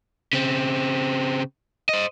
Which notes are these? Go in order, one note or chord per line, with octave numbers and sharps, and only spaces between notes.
C#3 C4
C5 D#5